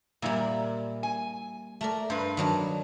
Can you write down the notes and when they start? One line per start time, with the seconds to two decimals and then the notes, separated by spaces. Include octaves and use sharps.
0.22 A#2 G3 A#3 E4
1.03 G#5
1.81 A3 A#4 D5
2.10 G2 B4 C5
2.37 D#3 F#3 D4